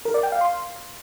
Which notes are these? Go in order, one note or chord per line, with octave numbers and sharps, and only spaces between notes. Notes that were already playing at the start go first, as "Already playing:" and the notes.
A#4
D5
G5
F5
C6